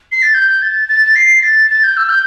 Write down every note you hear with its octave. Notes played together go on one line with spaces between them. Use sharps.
C7
A6
G6
A6
A6
C7
A6
A6
G6
E6
G6